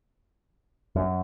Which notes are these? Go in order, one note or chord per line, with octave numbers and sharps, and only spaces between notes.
F#2